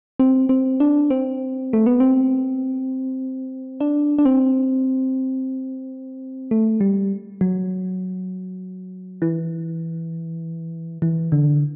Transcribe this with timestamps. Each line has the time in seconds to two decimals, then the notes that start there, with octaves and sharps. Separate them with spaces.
0.19 C4
0.49 C4
0.80 D4
1.10 C4
1.73 A3
1.86 B3
2.00 C4
3.80 D4
4.18 D4
4.25 C4
6.51 A3
6.81 G3
7.41 F#3
9.22 E3
11.02 E3
11.32 D3